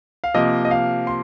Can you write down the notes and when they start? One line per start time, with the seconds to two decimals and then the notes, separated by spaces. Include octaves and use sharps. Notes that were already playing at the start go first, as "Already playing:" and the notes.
0.24 F5
0.34 C3 F3 A#3 D#5
0.65 D#5
0.71 F5
1.07 C6